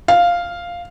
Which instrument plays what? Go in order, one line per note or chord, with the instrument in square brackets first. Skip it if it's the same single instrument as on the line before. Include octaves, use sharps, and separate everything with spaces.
[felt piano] F5